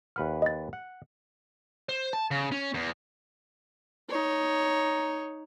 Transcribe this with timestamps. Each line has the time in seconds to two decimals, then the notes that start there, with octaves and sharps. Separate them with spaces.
0.16 D#2 B4 F#5 F6
0.42 D#5 A6
0.73 F#5
1.89 C5
2.13 A5
2.31 C#3
2.52 C#4
2.74 E2
4.10 D#4 C#5